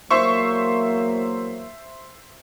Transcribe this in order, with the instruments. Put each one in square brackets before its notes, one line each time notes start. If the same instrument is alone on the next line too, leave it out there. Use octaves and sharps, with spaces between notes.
[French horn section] E2 F#3 A#3 [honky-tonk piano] C5 E5 C#6